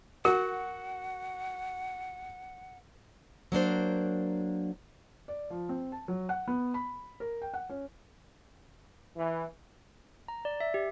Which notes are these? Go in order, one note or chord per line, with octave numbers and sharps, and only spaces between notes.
F#4 A#4 F#5
F#3 A#3 D4 C5
D5
F3
C4
A5
F#3
F#5
B3
B5
A#4
G5
F#5
C#4
E3
A#5
D5
E5
G4